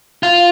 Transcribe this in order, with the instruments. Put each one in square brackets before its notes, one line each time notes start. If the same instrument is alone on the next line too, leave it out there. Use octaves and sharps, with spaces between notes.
[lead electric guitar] F4